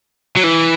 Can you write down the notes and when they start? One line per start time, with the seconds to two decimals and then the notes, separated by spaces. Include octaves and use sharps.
0.36 F#3
0.44 E3